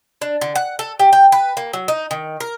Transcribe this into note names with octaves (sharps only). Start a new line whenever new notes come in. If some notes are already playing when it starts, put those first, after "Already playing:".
D4
D3
F#5
A4
G4
G5
B4
A#3
F#3
D#4
D#3
A#4